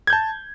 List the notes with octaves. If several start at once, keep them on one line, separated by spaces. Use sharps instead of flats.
A5 G6 G#6